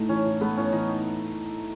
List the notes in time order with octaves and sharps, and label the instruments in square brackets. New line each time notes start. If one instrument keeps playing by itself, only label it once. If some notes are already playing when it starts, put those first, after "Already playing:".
Already playing: [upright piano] A2 A3 [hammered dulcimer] D#4
[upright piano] E3 [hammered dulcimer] C#4
[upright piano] A2
[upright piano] A3 [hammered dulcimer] B3
[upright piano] A2 [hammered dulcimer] C#4
[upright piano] E3 [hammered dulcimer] D#4